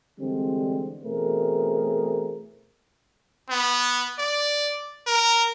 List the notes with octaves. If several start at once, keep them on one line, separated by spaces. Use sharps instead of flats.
D3 E3 G3 G#3 C4
B2 E3 A3 C4 G#4 A#4
B3
D5
A#4